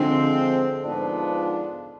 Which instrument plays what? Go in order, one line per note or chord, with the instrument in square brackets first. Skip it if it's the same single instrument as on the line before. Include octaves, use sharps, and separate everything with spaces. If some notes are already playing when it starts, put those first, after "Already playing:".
Already playing: [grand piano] D3 [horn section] F3 G#3 C4
[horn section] G#2 F3 B3 D4 F4